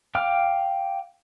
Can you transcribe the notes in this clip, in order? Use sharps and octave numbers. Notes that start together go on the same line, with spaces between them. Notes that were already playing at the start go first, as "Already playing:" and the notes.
F5 G5 D6 F6